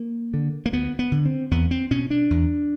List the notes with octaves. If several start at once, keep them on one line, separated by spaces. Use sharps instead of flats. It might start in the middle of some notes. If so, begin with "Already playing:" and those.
Already playing: A#3
D3
A#3
D2 B3
B3
D3
C4
E2 B3
C4
B2 C#4
D4
E2